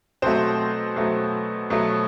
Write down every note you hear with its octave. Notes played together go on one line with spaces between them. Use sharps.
B2 F#3 A3 C4 C5
B2 F#3 A3
B2 F#3 A3